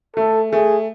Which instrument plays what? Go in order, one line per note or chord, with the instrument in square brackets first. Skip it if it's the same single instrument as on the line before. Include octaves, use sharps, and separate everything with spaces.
[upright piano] A3 [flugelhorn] A4
[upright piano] A3 [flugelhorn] G#4